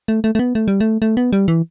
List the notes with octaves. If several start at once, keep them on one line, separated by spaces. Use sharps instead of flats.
A3
A3
A3
B3
A3
G3
A3
A3
B3
G3
E3